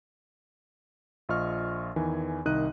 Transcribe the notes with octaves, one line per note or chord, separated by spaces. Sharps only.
A#1 F4 D#5 C#6 F6
E2 D#3 E3 G#5
C2 D#3 D#4 D#5 F#6 D#7